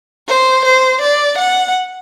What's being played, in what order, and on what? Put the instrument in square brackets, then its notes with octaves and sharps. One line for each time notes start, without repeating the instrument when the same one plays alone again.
[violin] C5
C5
D5
F#5